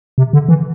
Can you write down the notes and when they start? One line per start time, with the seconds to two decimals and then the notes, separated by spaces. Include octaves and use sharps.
0.18 C3
0.33 D3
0.49 E3